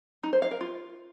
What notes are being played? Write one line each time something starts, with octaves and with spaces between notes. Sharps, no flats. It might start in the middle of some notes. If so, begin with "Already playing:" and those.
D#4
C5
F5
A#4
F4